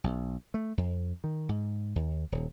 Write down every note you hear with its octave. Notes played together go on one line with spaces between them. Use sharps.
B1
A3
F2
D#3
G#2
D#2
D#1